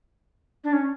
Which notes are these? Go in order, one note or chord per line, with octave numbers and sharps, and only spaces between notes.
D4
C#4